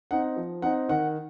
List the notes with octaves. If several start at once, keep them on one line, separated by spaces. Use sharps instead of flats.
C4 D#4 F#5
F3
C4 D#4 F#5
D#3 F#5